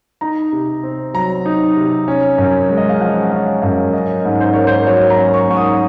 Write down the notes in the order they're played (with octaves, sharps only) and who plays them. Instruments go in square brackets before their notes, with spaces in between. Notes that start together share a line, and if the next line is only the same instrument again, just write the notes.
[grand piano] D#4 A#5
C3
C4
F#3 A#5
D#4
C3
C#4
F#2
G#3
D#5
F5
F3 F#5
C#4 F5
F#2 F5
C#4 D#5
G#2
C5
A#3 C#5
C5
F#3 C#5
A#5
C#4
C#6
G#2 C#6
D#6